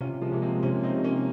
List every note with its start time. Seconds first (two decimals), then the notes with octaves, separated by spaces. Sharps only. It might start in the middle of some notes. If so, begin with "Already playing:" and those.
0.01 C3 C#4 F4
0.22 F3 G#3
0.32 C3 A#3
0.42 G#3 C4
0.63 C3 A#3 C#4
0.83 C4 D#4
0.94 C3
1.04 A#3 C#4